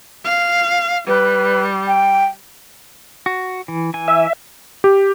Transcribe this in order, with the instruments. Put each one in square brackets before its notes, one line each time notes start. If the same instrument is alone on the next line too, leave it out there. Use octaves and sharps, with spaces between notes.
[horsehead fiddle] F5
[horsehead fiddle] G3 [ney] B4
[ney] G5
[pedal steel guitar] F#4
E3
E3 G#5
[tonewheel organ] E5
[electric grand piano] G4